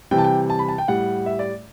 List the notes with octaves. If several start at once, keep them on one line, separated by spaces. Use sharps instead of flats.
C3 E3 G3 G5
A5
G5
A5
B5
A5
G5
A2 G3 F#5
E5
D5